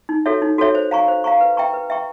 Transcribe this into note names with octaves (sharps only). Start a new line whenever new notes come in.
D#4
F#4 A4 C#5 E5
D#4
F#4 A4 C#5 E5
C5
F5 A#5 C#6
C5
F5 A#5 C#6
B4
E5 G5 A#5 C#6
B4
E5 G5 A#5 C#6